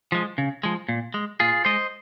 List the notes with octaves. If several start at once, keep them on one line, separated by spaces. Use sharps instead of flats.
F3 G#3
C#3
F3 G#3
A#2
G#3
A#2 F4 G#4
G#3 C5 D#5